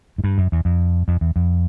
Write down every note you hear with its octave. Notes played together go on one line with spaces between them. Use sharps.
G#2
G2
F#2
E2
F2
F2
E2
F2